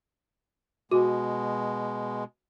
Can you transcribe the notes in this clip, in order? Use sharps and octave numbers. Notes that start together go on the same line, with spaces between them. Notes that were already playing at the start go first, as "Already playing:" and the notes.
B2 G#3 F#4